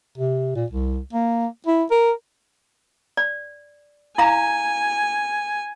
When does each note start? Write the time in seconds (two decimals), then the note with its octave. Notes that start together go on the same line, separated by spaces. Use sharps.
0.18 C3
0.56 A#2
0.70 C2
1.13 A#3
1.67 E4
1.91 A#4
3.17 D5
4.18 E4 F5 G#5 A#5